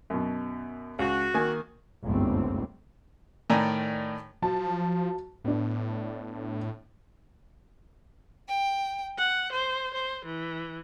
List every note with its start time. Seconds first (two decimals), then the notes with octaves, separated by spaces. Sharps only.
0.10 F#2 B2
0.99 C#2 F#4
1.34 D#3 A#3 G#5
2.03 G1 C#2 F#2 A2 A3 C4
3.50 A2 D#3 D5 G#5 A#5
4.42 F3 F#3 A5
5.44 A2 B3 D4
8.48 G5
9.18 F#5
9.52 C5
9.93 C5
10.25 E3